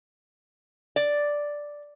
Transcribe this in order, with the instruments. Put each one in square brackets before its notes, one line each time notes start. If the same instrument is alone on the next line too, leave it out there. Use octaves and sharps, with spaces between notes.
[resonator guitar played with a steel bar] D5